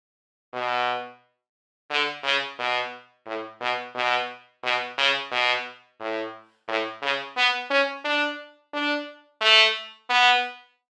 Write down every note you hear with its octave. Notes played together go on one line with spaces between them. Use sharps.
B2
D3
C#3
B2
A2
B2
B2
B2
C#3
B2
A2
A2
C#3
B3
C#4
D4
D4
A3
B3